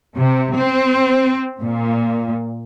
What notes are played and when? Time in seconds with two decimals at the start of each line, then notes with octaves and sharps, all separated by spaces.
0.17 C3
0.57 C4
1.62 A#2